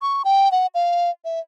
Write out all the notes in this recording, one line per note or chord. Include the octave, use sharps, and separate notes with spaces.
C#6
G5
F#5
F5
E5